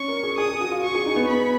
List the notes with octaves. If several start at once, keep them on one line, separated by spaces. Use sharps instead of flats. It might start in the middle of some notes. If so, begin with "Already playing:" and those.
Already playing: C#4 C#6
A#4
G#4
G#4 D#6
G#4
F#4
F4
F#4 C#6
G#4
D#4
B3
B5